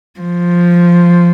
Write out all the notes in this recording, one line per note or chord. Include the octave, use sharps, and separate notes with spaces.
F3